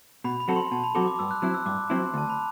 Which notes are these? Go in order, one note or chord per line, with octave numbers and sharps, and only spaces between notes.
B2 B5
B5
F#3 C4 F#4 A4
C6
B2 A5
B5
F#3 C4 F#4 A4 D6
D6
G2 E6
F#6
F#3 C4 E4 F#6
E6
G2 D6
F#3 C4 E4 C6
D2 A5
B5